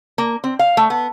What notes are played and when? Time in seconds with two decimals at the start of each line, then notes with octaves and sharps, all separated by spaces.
0.18 A#3
0.44 C4
0.59 F5
0.77 A3
0.90 B3